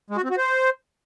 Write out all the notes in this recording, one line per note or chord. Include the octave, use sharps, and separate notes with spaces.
G#3
F#4
C4
F#4
C5